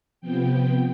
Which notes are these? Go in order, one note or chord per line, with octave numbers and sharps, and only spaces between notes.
C3 F3 B3 G5